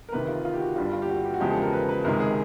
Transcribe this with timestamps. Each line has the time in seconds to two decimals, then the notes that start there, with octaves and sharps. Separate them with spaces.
0.09 A#4
0.12 D2 C3 D#3 B4
0.28 F4
0.45 F4
0.54 G4
0.60 F#4
0.76 G1 G2 D3 G3 F4
0.93 F4
1.02 G4
1.09 F#4
1.25 G4
1.34 F#4
1.40 E2 C#3 F3 G#3 G4
1.51 A4
1.62 A#4
1.73 B4
1.89 B4
2.04 C#2 C3 D#3 G#3 A#4
2.20 G#4